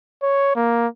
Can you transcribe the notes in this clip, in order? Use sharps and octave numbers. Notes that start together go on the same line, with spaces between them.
C#5
A#3